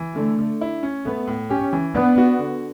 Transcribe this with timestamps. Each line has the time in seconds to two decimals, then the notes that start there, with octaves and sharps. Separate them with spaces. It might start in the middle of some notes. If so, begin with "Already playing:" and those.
Already playing: E3
0.16 D3 A3
0.39 D3
0.61 E4
0.83 C#4
1.05 A3 B3
1.27 A2
1.50 C#4 G4
1.73 E3
1.95 B3 D4
2.18 F#4
2.39 D3